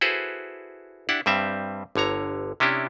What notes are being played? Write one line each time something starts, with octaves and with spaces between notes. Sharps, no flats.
E4 F#4 G#4 A4 B4 C5
D4 E4 G4 F#5
G2 G3 C4 E5
G1 D3 C#5 A#5
C3 C#4 D4 E4 G4